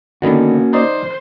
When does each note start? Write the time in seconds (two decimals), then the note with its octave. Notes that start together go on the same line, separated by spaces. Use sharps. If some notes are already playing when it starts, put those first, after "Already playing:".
0.22 D3 D#3 A#3 B3 C#4 F#4
0.73 D#4 C5 D5 D#5